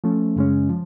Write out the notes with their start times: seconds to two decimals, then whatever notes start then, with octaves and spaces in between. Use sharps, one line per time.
0.04 F3 A3 C#4
0.36 F#2 C#3 G#3 C#4
0.69 F3